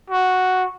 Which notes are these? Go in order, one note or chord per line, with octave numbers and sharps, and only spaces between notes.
F#4